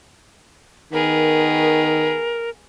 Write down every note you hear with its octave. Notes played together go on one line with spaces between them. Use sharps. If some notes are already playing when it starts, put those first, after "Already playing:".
D#3 B3 G#4 A#4